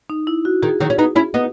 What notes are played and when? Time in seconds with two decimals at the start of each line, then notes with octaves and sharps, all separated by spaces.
0.10 D#4
0.27 E4
0.45 F#4
0.63 D#3 G#4
0.80 D#3 F#3
0.90 C#4
0.98 B3 D#4
1.16 C#4 E4
1.34 B3 D#4